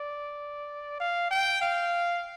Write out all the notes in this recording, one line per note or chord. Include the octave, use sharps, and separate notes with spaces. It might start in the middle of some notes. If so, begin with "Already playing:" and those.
Already playing: D5
F5
G5
F5